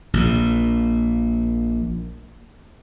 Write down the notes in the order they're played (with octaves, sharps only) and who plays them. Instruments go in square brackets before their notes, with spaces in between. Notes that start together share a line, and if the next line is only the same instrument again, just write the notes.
[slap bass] A#1 A#2